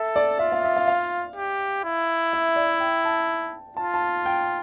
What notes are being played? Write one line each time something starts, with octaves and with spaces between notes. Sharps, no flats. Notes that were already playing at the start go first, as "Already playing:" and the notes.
Already playing: A4 E5
D5
F4 E5
F5
E5
F5
F5
G4
E4
E5
D5
G5
A5
F4 A5
A5
G5